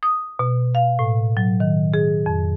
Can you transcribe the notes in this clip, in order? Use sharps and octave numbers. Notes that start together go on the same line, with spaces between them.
D#6
B2
F5
A2
F#3
D#3
G#4
F2